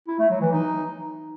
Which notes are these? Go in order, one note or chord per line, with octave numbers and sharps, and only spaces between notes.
E4
A3
F#3
E3
D#4